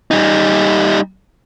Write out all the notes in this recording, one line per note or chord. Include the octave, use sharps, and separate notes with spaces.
G3 D#4